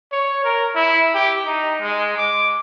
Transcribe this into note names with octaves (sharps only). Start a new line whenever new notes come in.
C#5
A#4
E4
G4
D#4
G#3
D6